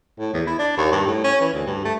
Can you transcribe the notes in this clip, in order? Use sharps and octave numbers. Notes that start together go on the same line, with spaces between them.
A2
E2
E4
D4
D#2
G2
A2
C#4
E3
D2
G2
A3